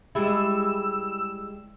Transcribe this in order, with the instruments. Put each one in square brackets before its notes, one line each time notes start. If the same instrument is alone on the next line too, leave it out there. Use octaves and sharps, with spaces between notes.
[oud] G3 G#3 E4 [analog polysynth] E6